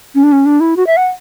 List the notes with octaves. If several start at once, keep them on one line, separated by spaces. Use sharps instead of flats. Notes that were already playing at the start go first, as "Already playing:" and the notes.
C#4
D4
C#4
D4
E4
F#4
E5
F#5